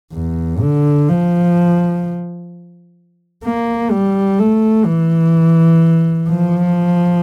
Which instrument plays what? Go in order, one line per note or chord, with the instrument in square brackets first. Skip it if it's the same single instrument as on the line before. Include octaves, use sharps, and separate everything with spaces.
[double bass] E2
D3
F3
A#3
G3
A3
E3
F3